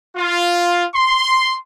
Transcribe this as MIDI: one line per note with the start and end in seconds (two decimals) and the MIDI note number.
0.16 0.85 65
0.95 1.56 84